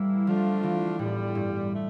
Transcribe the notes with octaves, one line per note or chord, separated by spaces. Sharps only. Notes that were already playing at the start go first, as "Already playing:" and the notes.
Already playing: A2 E3 G3 A#3 E4
D3 F3 A3 D4 F4
E3
E2 A2 D3 G3
G2
D3 A3